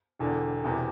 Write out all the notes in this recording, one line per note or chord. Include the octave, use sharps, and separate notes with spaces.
E1 E2 D3
E1 E2 C3 E3